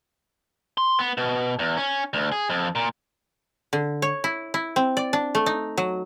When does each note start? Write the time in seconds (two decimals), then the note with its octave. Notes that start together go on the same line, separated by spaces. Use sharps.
0.78 C6
0.99 B3
1.17 B2
1.59 E2
1.77 C#4
2.13 D2
2.32 G#4
2.50 F2
2.75 A#2
3.73 D3
4.02 C#5
4.24 E4
4.54 E4
4.76 C4
4.97 D5
5.13 D4
5.35 A3
5.46 D#4
5.78 F#3